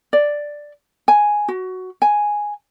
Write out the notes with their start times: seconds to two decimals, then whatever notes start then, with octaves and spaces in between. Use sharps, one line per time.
0.13 D5
1.08 G#5
1.48 F#4
2.02 G#5